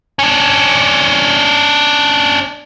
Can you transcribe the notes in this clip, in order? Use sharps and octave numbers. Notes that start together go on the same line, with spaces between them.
C#4 D4